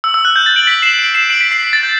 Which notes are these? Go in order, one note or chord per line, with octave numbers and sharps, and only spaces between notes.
E6
E6
F#6
G6
A6
D7 F#7
B6 D7
C7 E7
D7 F#7
C7 E7
D7 F#7
B6 D7
C7
B6
A6
G6